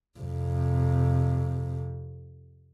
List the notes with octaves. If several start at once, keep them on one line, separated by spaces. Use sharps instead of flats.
F2 C3